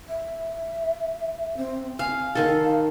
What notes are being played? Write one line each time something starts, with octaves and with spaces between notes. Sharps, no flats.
E5
C4
F5 G#5
D#3 A4 F5